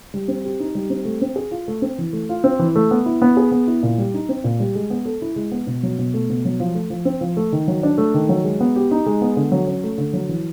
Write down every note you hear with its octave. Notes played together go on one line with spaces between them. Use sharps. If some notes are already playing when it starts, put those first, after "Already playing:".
G3
C4
G4
D#4
G3
C4
A3
C4
G#4
F4
A3
C4
E3
A3
F4
C4
E3
A3
B3
E4
B3
G#4
B3
E4
A#2
G3
D#4
C4
A#2
G3
G#3
B3
A4
E4
G#3
B3
B2
F#3
B2
A3
B2
F#3
F3
A3
F3
C4
F3
A3
D#3
F#3
D4
A3
D#3
F#3
G#3
B3
G4
D#4
G#3
B3
D3
F#3
C#4
A3
D3
F#3
E3